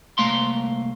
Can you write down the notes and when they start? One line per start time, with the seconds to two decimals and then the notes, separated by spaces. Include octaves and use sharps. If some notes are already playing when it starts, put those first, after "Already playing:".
0.18 C2 A3 A#3 F5 A#5 C6